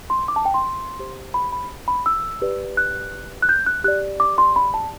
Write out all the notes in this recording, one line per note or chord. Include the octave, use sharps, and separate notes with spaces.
C6
D6
A5
G5
C6
G4 C5
B5
B5
B5
E6
G4 B4 D5
F#6
F#6
G6
F#6
G4 D5 F#6
D6
C6
B5
A5